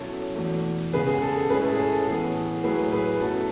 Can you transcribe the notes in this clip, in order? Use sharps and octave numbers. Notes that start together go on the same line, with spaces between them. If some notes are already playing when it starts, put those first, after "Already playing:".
Already playing: B2 F#3 C#4 E4 A4 C#5
E2 B2 A3
C#3 G#3 B3 G#4 B4
G#4
A4
G#4
A2 G#3 C#4 E4 G#4 B4
A4
G#4
A4
A4
A2 E3 B3 G#4
A2 F#3 A3 E4 G#4 B4
G#4 B4
B4
B2 F#3 A3 C#4 E4 A4